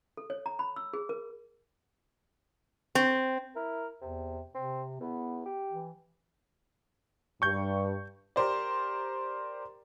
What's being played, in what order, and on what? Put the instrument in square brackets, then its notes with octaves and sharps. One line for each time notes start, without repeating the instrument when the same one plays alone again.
[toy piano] A4
C#5
A#5
B5
E6
G#4
A#4
[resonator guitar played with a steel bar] C4
[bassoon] E4 [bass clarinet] A#4
[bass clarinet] E2 [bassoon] C3
[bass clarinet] C3 [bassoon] C4
[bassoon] E2 [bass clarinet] B3
[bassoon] G4
[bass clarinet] E3
[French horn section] G2 [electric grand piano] C#6 G6
[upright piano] G4 A#4 C5 D5